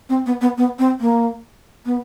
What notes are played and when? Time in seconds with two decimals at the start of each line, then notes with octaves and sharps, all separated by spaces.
0.09 C4
0.26 B3
0.41 B3
0.58 B3
0.79 C4
1.00 A#3
1.86 B3